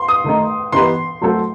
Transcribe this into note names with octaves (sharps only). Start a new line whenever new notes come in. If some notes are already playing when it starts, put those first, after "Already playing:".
Already playing: C6
D#6
D#3 A3 D#4
E3 B3 D#4 G4 B4 C6
F#3 A3 C4 F#4 A4